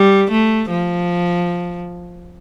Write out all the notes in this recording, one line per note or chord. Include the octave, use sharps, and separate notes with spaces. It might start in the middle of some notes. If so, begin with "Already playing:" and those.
Already playing: G3
A3
F3